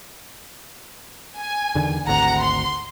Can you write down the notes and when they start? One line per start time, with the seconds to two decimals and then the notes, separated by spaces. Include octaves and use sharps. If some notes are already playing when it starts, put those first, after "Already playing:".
1.37 G#5
1.75 E2 D3 D#3
2.07 G#1 D2 F#5 A#5
2.43 C6